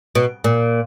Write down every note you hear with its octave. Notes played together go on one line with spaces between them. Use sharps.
B2
A#2